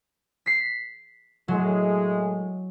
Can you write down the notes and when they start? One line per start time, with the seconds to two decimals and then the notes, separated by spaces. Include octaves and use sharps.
0.46 B6 C7
1.48 A2 F#3 G#3